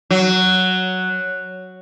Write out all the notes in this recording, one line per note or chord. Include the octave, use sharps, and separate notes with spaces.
F#3